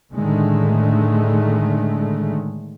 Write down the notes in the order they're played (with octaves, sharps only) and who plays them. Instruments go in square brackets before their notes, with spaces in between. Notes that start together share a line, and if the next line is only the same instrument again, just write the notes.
[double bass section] A2 D3 D#3 G#3 A3